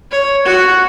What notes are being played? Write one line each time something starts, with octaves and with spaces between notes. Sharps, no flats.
C#5
F#4 F#5